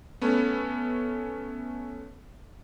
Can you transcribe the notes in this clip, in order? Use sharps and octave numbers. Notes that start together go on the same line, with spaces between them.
A3 B3 C#4